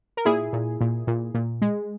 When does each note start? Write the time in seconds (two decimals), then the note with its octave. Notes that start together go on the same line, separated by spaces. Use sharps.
0.17 A#4
0.25 A#2 E4 G#4
0.53 A#2
0.81 A#2
1.07 A#2
1.34 A#2
1.62 G#3